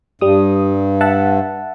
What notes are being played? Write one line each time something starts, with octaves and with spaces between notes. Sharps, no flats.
G2 G3 D#6
E5 F#5 A5